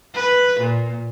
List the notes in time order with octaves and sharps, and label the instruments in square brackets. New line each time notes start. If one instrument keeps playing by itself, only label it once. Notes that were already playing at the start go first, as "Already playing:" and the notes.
[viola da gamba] B4
A#2